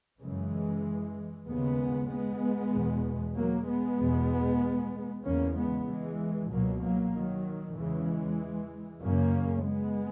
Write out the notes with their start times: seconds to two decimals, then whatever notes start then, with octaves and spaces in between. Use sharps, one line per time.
0.21 F#2 C#3 E3 G#3
1.47 D#2 C#3 G#3 B3
2.10 G#3 B3
2.73 E2 B2
3.36 F#3 A#3
3.67 G#3 B3
3.99 E2 B2
5.25 E2 C#3 A#3 C#4
5.56 G#3 B3
5.87 E3 G#3
6.50 C#2 B2 F#3 A#3
6.82 F#3 A#3
7.14 D#3 F#3
7.76 E2 C#3 E3 G#3
9.02 F#2 C#3 A#3 C#4
9.65 G#3 B3